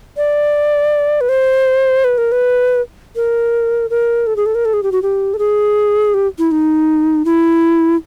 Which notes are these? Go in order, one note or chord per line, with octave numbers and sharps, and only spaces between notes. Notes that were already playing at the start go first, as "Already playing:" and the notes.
D5
B4
C5
B4
A#4
B4
A#4
A#4
A4
G#4
A4
A#4
A4
G#4
G4
F#4
G4
A4
G#4
G4
E4
D#4
E4